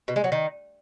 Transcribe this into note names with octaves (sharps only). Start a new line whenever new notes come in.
B2
G#3
F#3
D#3